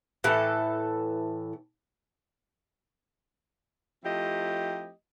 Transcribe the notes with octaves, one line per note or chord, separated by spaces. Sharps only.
A2 E3 A4
F3 A3 C4 E4 G4 D#5